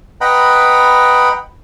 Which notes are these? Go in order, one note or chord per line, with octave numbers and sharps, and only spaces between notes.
B4 D#5 F#5 G5 A#5 B5